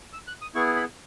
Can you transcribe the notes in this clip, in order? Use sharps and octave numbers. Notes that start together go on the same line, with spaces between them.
E6
F#6
D#6
B3 E4 G#4 C#6
B5